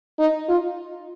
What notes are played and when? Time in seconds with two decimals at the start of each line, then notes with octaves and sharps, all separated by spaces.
0.19 D#4
0.49 F4